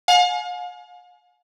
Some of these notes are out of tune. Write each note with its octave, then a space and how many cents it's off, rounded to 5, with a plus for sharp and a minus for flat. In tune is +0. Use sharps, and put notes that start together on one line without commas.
F5 +40 G#5 +35